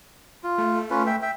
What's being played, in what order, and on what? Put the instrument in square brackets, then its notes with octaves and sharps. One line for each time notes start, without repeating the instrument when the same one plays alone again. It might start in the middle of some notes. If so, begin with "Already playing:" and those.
[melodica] F4
[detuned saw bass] A3
[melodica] C#4 F4 B4
E5 G5
E5 G5